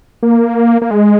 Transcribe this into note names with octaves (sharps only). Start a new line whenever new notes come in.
A#3
A#3
G#3